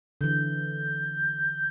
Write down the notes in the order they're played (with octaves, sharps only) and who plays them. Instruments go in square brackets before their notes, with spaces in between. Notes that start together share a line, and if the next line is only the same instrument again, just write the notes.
[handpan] D3 E3 [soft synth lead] G6